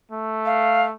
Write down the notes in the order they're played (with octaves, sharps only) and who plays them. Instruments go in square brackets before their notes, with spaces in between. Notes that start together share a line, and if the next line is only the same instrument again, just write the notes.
[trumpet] A3
[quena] F5